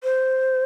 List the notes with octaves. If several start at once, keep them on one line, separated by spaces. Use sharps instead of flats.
C5